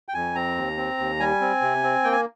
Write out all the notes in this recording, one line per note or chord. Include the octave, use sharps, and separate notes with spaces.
G5
F2 G#5
C4 A#5
D#2
C4
D#2
G3 G#5
C4
C3
C4
A#3 G5
G#5